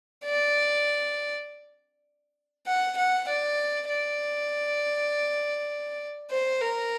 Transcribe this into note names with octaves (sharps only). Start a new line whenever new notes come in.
D5
F#5
F#5
D5
D5
C5
A#4